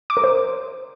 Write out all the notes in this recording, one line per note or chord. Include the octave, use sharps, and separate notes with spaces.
D6
A#4
C5